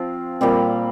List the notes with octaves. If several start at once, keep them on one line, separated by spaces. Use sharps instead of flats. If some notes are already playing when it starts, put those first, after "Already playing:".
Already playing: F3 C4 F4
A#2 G3 C4